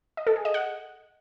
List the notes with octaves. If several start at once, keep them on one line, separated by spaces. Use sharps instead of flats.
D#5
A4
G#4
D#5
F#5